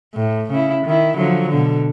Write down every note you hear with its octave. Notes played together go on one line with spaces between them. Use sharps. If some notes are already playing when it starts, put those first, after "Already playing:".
A2
C#3 E4
D#3 E4
D3 F3 F#3
B2 D3